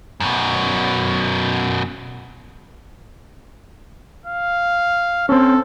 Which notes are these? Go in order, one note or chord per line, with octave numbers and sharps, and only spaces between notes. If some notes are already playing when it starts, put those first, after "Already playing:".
F#2 B2
F5
C4 C#4 A4